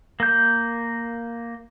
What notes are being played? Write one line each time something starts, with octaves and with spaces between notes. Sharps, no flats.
A#3 G6